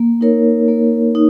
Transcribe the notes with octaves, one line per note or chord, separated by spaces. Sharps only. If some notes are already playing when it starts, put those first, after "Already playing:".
Already playing: A#3
D#4 A#4 C#5
A#3
D#4